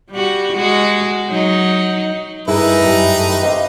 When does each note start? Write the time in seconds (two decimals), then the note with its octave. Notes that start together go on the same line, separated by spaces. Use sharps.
0.11 G3 F#4
0.56 G#3 F#4
1.30 F#3 D#4
2.48 G2 D#4 E4 G#4 A#4 B4
2.82 F#2 G4
3.17 A3
3.29 D#3
3.43 C3 D#5 F5